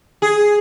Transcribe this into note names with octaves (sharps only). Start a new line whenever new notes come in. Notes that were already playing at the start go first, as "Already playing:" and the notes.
G#4